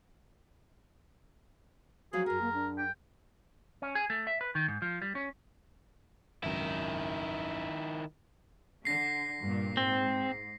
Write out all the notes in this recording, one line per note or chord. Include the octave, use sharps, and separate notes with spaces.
F3 F#3 C#4 F#4 G#4
F#2 G#4 A#4
A#3
D4
G5
C#4
G#4
A3
E5
B4
D#3
G#2
F3
G3
C#4
G#1 C#2 F#2 D#3 E4
D3 A#6 C7
G2 A#2
G#2 C4